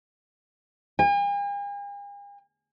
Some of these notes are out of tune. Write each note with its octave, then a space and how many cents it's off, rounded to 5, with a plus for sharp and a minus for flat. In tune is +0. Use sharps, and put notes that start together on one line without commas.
G#5 -45